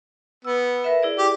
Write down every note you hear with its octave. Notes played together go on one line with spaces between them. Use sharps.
B3 E6
A#4 B4 E5
E4 G#4 D5
G4